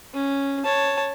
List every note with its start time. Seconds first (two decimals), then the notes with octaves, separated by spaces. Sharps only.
0.14 C#4
0.64 C#5 A5